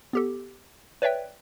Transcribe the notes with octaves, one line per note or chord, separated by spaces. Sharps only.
B3 G4 A4
B4 C#5 D5 E5 G5